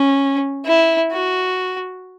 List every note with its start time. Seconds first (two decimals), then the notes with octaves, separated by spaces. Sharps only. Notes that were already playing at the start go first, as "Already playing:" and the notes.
Already playing: C#4
0.66 E4
1.12 F#4